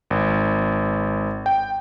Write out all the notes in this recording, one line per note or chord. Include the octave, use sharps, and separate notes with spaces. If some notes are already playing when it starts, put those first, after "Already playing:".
G#1
G5